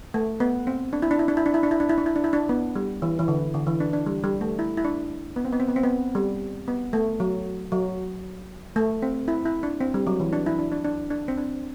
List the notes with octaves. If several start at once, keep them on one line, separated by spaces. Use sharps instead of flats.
A3
B3
C4
D4
E4
D4
E4
D4
E4
D4
E4
D4
E4
D4
E4
D4
E4
D4
E4
D4
B3
G3
E3
E3
D3
D3
E3
D4
D4
G3
G3
A3
E4
E4
D4
B3
C4
B3
C4
B3
C4
B3
G3
B3
A3
F#3
F#3
A3
C4
E4
E4
D4
C4
G3
F#3
E3
D4
E4
D4
D4
D4
D4
C4
D4